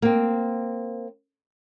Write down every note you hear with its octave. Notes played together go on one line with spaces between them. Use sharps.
A#3 C4